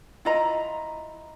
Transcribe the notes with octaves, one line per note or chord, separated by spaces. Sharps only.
E4 F4 D#5 A#5